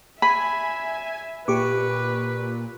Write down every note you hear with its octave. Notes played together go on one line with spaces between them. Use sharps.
E5 G#5 B5
A#2 G4 B4 C#6 D6